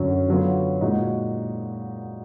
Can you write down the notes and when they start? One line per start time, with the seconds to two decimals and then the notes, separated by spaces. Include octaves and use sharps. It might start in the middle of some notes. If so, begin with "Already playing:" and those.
Already playing: F#2 D3 F#3
0.28 D3 F#3 B3 F4
0.81 A#2 G#3 D#4 F#4